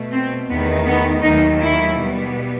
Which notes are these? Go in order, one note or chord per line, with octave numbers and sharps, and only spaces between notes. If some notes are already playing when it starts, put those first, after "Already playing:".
Already playing: B2 A3
C4
E2 D#3 A3 B3
B3
D#2 D#3 F#3 A3 D#4
E4
B2 G3 B3